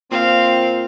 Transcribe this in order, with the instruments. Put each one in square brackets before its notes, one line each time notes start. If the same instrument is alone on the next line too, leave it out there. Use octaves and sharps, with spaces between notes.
[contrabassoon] A#2 [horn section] C4 [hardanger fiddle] F5